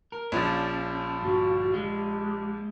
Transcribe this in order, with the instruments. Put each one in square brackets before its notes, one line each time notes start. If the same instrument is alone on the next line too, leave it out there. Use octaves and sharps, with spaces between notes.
[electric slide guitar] A#4
[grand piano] A#1 F3 D4 [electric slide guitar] C#4
[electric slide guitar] G2 D3 [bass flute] F#4
[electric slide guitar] G#3 [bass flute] G4